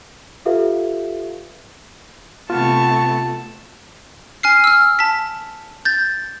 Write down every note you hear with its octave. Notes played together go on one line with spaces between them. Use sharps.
F4 G4 A4 B4 E5 F5
C3 A3 B3 F4 A5 C#6
G#5 F6 C7
E6 F6
A5 B6
G6 A6